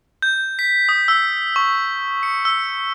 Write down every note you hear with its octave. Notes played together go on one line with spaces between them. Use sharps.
G6
B6
D#6
E6
C#6
C#7
E6